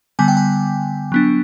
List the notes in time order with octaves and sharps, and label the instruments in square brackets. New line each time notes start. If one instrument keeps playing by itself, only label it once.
[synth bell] D3 G3 B3 G#5
G5
G#5
F#3 B3 D4